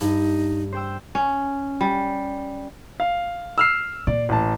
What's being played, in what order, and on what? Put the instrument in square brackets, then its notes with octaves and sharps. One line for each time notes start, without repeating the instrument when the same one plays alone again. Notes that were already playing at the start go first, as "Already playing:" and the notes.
[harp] G2 [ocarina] D#4
[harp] C5 G5 E6
[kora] C#4
G3
[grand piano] F5
E6 F6 C7
[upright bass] A#2 [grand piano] D5
[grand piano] A1 A5